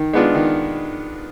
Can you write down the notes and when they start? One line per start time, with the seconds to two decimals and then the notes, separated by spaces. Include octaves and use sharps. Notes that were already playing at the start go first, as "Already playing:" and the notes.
Already playing: D#3
0.13 G#3 B3 D4 F4
0.35 D#3